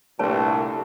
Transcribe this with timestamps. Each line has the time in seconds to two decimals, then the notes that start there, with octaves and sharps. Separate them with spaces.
0.19 C2 A#2 A3 D4 G4 B4 C#5 A5